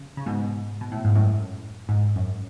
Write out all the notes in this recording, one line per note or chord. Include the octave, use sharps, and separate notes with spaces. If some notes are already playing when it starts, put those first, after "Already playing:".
Already playing: C#3
C#3
G#2 B2
B2
A2
G#2
F#2 A2
G#2
F#2